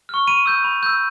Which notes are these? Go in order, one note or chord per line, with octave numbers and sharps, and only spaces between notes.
C#6 F6
B5 D#7
E6 G6
B5
E6 G6